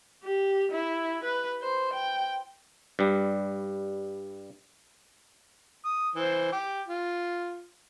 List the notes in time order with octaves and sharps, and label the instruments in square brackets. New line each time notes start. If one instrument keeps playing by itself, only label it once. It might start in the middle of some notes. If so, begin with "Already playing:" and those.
[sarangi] G4
E4
B4
C5
G5
[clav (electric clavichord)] G2 G3
[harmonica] D#6
E3 C5
G5 D6
F4